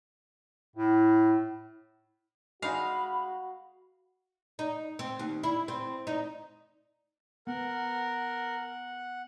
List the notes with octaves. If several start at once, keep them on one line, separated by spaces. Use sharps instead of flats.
A2 E4
G#3 D#4 F#4 F5 B5
D#4
C4
D#2
E4
C4
D#4
B3 A#4 F#5